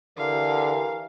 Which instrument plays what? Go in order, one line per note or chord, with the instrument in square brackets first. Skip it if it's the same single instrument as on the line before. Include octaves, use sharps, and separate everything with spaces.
[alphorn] D3 [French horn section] E3 G4 A#4 [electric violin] F5